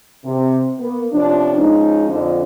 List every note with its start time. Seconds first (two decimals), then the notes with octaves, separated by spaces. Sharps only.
0.24 C3
0.79 A#3 B3
1.12 C3 F3 C#4 D4
1.58 F3 G#3 C#4 D#4
2.09 F2 D3 F3